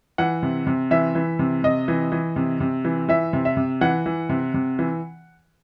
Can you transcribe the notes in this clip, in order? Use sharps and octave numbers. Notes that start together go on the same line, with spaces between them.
E3 F#5
C3
C3
E3 E5
E3
C3
C3 D#5
E3
E3
C3
C3
E3
E3 E5
C3
E5
C3
E3 F#5
E3
C3
C3
E3